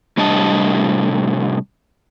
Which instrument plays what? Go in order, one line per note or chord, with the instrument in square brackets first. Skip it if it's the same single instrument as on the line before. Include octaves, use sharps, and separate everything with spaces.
[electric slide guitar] A2 C3 G3 D4 D#5 A5